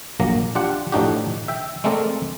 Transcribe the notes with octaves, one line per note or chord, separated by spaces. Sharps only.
A#1 F#3 A#3 A#5
D4 F4 G4 F#5
A2 F3 D4 D#4 F#4 G4
E5 G5
G#3 A3 C4 A#4 D5